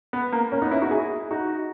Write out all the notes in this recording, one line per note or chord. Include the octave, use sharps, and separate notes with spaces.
B3
A#3
A#3 C#4
B3 D#4
C#4 E4
D#4 F#4
E4 G#4
D#4 F#4